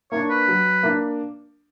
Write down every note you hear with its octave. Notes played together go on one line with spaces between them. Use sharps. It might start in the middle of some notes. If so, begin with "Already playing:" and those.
A#3 D4 C#5
B4
F#3
A#3 D4